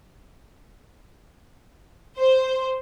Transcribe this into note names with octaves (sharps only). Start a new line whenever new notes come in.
C5